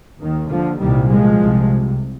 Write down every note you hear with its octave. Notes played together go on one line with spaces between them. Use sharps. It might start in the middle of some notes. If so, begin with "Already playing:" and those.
D#2 D#3
D3 F3
C2 A#2 D#3 G3
F3 G#3
C2 C3